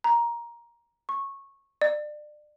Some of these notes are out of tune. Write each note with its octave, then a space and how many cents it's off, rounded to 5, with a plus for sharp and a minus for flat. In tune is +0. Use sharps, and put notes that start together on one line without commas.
A#5 +15
C#6 -15
D5 +30